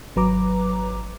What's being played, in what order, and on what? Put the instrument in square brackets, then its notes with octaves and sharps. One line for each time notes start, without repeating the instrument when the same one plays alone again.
[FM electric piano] G#1 F#3 B4 A#5 D6